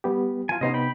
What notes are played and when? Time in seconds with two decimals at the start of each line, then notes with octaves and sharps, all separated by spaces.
0.04 G3 B3 G4
0.49 E3 F4 G#5
0.61 C3 B3 C#4 D#4 C5 D#5
0.74 G5 B5